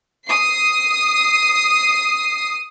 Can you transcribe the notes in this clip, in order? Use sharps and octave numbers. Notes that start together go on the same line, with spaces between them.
D#6 C7